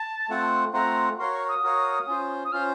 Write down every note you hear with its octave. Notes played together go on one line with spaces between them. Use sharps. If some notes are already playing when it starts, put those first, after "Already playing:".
Already playing: A5
A3 C4 F4 C5 F#5
A3 C4 F4 C5 F#5 A#5
F#4 A#4 C#5 F5 C6
C#6
D#6
F#4 A#4 C#5 F5
C#4 F4 C5
D#6
C#4 F4 C5 F6